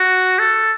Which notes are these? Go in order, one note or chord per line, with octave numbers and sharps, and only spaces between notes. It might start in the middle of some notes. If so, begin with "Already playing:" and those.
Already playing: F#4
A4